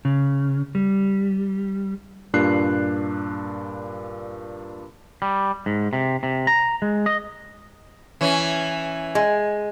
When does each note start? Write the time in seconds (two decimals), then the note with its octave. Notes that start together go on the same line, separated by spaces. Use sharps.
0.05 C#3
0.75 G3
2.34 G2 A#2 D4 F#6 C7
5.22 G3
5.66 G#2
5.93 C3
6.23 C3
6.47 A#5
6.82 G#3
7.06 D#5
8.21 E3 C#4
9.15 G#3